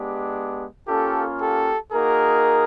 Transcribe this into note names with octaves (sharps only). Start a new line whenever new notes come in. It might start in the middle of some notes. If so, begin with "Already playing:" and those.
Already playing: G#3 B3 D4 G4
A#3 C#4 F4 G4 A4
G4 A4
A#3 D#4 F#4 G#4 A#4